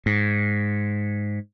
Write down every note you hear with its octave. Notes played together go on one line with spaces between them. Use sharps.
G#2